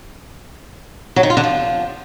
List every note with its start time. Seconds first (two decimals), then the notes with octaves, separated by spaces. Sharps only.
1.16 F#3
1.23 D#3
1.30 F4
1.37 D3
1.44 F3